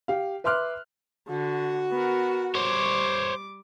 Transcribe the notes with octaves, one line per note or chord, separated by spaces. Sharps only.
G4 F5
B4 E5 C6 D6 F6 F#6
D3 F#4
B3 A#4
G3 C5 C#5 D6